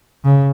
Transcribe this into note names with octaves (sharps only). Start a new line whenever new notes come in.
C#3